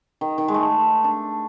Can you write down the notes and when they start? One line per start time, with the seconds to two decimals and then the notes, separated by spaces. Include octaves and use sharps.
0.21 D#3
0.38 D#3
0.48 G#3
0.54 A3
1.04 D4